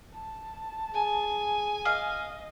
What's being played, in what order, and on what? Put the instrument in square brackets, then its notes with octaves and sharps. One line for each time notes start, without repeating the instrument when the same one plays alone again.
[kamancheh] A5
[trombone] G#4 [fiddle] G#5
[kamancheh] D#5 [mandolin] F5